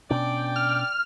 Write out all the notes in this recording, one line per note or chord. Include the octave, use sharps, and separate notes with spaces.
B2 C#4 D4 D5 G5
F6